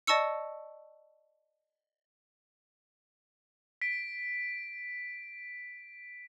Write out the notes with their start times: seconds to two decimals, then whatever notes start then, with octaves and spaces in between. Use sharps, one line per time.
0.07 D5 D#5 A5 C#6 E6 C#7
3.82 B6 D7